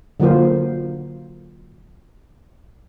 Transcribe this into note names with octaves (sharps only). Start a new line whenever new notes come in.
D3 F#3 A#3 F4 C5